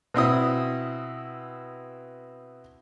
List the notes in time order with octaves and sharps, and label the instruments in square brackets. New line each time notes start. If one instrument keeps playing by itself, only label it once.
[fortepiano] B2 C4 E4 D#6